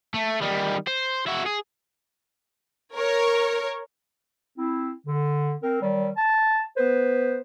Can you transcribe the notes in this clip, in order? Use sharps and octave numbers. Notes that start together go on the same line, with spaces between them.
A3
D#3 G3
C5
E4 F#4
G#4
A#4 C#5
C4 E4
D3
C4 A#4
D#3 F#3 G3
A5
B3 B4 C5